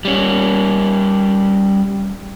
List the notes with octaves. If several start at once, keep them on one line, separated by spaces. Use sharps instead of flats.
G3 C#4